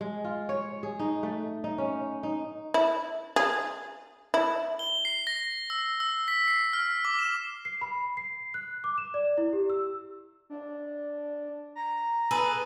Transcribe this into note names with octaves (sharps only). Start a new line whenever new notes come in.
G#3
F4
C#5
G#4
D#4
A3
D#4
C#4
D#4
E4
G#4
E4
G7
C7
A#6
E6
E6
B6
C7
F6
D6
E7
C7
B5
C7
F#6
D6
E7
D5
E4
G4
E6
D4
A#5
G#4 A4 B4